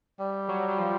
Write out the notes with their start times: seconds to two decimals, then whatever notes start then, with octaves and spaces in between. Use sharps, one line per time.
0.20 G3
0.48 F#3
0.68 F#3
0.78 F3